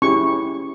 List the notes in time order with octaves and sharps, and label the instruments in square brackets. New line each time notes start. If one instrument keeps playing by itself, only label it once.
[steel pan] C#4 E4 G4 C#6